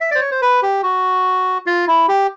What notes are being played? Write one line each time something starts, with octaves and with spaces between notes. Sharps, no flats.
E5
C5 D5
C#5
C5
B4
G4
F#4
F4
E4
G4